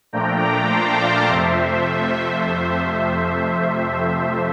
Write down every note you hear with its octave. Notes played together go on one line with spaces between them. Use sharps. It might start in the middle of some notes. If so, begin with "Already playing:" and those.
A#2 F3 A3 D4 G5 A#5
A#5 D6
A5 C6
D5 F5
F2 C3 F3 A3 C5 E5
C5